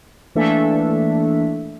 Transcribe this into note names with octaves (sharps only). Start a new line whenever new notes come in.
E3 A3 A#3 D4 A4 E5